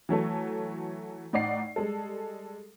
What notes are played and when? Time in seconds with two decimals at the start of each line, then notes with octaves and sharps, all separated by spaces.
0.09 E3 F#3 A3 A4
1.33 A2 D#4 D5 F#5 C7
1.76 G3 G#3 A4